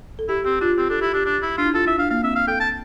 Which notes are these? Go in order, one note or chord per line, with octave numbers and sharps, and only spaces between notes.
A4
E4 G4
C4 G4
D4 F4
C4 G4
D4 A4
E4 G4
D4 G4
D4
E4
D4 F4
E4
F4 A4
E4 E5
D4 F5
A#3 F5
C4 E5
F5
A4 G5
A5